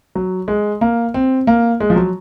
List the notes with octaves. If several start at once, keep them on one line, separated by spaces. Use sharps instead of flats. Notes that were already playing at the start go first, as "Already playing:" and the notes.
F#3
G#3
A#3
C4
A#3
G#3
F3
F#3